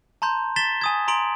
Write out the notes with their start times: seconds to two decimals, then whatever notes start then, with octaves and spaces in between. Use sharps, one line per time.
0.22 A5 A#5 C6 G6
0.56 A6 B6 E7 G7
0.81 G#5 D#6 G#6
1.08 A#5 C6 D7 F#7